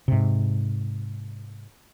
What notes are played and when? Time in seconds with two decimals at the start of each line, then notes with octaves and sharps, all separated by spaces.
0.08 G#2 C3